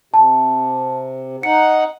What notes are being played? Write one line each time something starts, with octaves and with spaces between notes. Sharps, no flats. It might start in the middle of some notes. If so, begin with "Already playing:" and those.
C3 A5
D#4 F#5 C#7